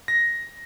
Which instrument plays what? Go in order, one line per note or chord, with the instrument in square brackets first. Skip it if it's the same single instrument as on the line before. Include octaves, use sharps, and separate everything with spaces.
[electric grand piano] A#6